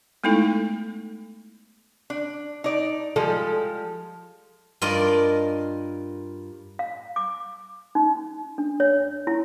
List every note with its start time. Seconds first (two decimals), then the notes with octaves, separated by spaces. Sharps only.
0.24 G#3 A3 B3 D#4 E4 A4
2.10 D4
2.64 D#4 D5
3.16 F3 G3 G#3 A4
4.82 G2 F4 A#4 D5 D#5
6.79 F5
7.16 D6
7.95 D#4
8.58 D4
8.80 C#5
9.27 E4